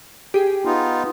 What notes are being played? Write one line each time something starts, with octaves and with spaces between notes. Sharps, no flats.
G4 G#4
B3 D#4 F4